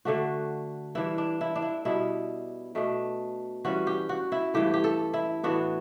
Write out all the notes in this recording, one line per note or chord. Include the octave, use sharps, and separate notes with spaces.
D3 A3 D4 F#4
E3 G3 D4 E4
D4
E4
D4
E4
B2 G3 B3 D4 E4
B2 A3 D4
E3 G3 C#4 F#4
G4
F#4
E4
G2 E3 A3 G4
G4
A4
E4
A2 E3 B3 D4 F#4